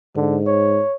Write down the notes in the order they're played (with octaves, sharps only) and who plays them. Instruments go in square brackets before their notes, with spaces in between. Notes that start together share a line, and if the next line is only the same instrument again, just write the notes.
[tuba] G#2 [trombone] D3
[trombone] C#5